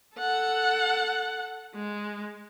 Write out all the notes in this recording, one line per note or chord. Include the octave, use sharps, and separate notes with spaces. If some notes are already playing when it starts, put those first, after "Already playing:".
A4 F#5
G#3